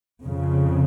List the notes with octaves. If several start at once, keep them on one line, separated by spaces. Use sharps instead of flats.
F2 C#3